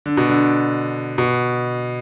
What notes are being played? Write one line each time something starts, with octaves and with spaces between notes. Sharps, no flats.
D3
B2
D3
B2